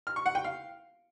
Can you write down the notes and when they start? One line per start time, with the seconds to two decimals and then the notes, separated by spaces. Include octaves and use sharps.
0.07 F6
0.16 C#6
0.26 F#5
0.35 G5
0.44 F5